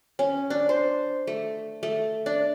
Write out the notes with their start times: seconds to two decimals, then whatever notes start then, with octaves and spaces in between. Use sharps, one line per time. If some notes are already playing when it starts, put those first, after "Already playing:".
0.19 C#4
0.50 D4
0.69 C5
1.27 A3
1.83 A3
2.26 D4